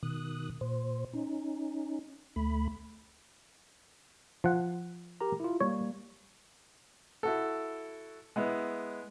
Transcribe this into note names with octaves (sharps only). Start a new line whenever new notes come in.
B2 D#3 D#6 F#6
A#2 C5
C#4 D#4
D2 A3 B5
F3 F#5
G4 A#4 A#5
E4 F4
G3 A#3 C#5
E4 F#4 A4
G#3 B3 E4